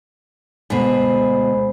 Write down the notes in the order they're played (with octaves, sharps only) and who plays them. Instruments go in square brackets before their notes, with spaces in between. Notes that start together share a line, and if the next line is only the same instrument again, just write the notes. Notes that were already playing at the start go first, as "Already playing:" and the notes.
[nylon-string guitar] D2 B2 [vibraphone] G#3 C5 B5